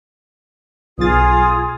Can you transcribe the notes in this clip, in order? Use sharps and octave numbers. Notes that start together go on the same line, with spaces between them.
B1 F4 G#4 D#6 A6